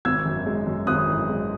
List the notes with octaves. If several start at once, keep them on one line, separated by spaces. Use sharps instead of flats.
G#1 E6 G#6
F#2
G#3
F#2
G#1 D#6 F#6
E3
G#3